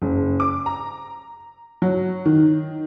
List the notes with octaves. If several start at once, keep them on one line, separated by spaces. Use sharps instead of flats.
F#1
D6
A#5
F#3
D#3